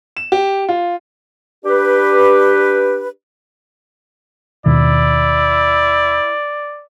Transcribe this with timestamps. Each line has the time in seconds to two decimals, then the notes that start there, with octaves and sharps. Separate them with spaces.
0.17 E7
0.32 G4
0.69 F4
1.65 D4 G4 B4
4.66 D#2 B2 D#3 E4 D5